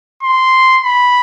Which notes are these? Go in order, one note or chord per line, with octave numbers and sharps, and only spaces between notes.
C6
B5